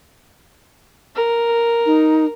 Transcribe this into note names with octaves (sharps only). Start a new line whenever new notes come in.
A#4
D#4